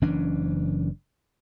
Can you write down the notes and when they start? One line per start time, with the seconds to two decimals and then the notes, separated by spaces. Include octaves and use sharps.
0.02 F#1 E3 C#4 D4